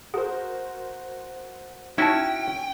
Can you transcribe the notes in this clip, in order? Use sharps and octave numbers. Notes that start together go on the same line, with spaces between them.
F#4 G#4 A#4 C5
C#4 D#4 E4 F#4 G5 A5